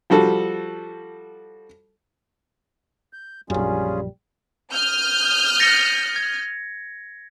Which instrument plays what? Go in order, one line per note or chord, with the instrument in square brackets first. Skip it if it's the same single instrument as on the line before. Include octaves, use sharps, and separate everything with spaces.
[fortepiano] F3 G3 F#4 A4
[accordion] G6
[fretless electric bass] A#1 F#2 [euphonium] G3 [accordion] C#4 F4 G#4
[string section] D#6 F6 G6
[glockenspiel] A6 A#6 C#7
G#6